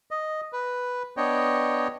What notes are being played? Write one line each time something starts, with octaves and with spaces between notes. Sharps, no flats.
D#5
B4
B3 D4 C#5 D#5 G5